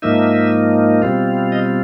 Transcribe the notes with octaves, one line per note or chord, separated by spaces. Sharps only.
G#2 F3 A#3 D#4 E5
B2 G3 C4 F4
D#5